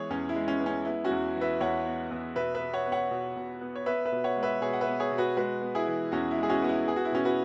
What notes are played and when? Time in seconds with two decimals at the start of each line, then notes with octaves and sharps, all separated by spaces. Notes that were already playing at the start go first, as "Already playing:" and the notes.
Already playing: E3 G#3 B3 G#4 C#5
0.10 E2 C#4
0.29 E4
0.36 G#3
0.48 C#4
0.60 B3
0.66 C#4
0.85 B3 E4
1.04 C#4 F#4
1.11 E2
1.36 E3
1.41 B4 E5
1.61 E2 C#5 F#5
1.86 B3
2.11 E2
2.36 B2 B4 E5
2.55 B4 E5
2.61 B3
2.73 C#5 F#5
2.86 B3
2.92 C#5 F#5
3.11 B2
3.36 B2
3.61 B3
3.76 C#5
3.86 B3 B4 E5
4.05 B4 E5
4.12 B2
4.24 C#5 F#5
4.36 G#3
4.43 B4 E5
4.62 B2 G#4 C#5
4.73 F#5
4.81 B4 E5
4.87 B3
5.00 G#4 C#5
5.12 B2
5.18 F#4 B4
5.37 G#3 F#4 B4
5.62 B3
5.75 E4 G#4
5.88 E3
6.12 E2 C#4 F#4
6.31 E4
6.38 G#3
6.43 G#4
6.49 C#4 F#4
6.62 B3 F#4
6.69 E4
6.87 B3 G#4
6.96 F#4
7.05 E4
7.12 B2 C#4 F#4
7.25 F#4 B4